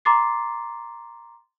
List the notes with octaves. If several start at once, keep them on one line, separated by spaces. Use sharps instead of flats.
A#5 C6 D6 A6 C7